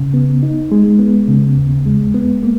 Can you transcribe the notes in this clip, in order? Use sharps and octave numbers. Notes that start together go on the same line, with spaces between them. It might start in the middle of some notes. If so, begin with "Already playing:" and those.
Already playing: C#3
B3
D#4
G#3
B3
C#3
D#2
G#3
B3
A#3